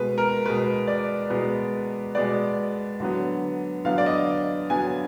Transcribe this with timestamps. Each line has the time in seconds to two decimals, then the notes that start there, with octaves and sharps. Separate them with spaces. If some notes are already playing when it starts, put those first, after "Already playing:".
Already playing: B2 G#3 B3 B4
0.18 A#4
0.46 B2 G#3 B3 B4
0.88 D5
1.30 B2 G#3 B3
2.15 B2 G#3 B3 D5
3.00 D3 F#3 B3
3.85 D3 F#3 B3 F5
3.98 D5
4.06 D#5
4.70 D3 F#3 B3 G#5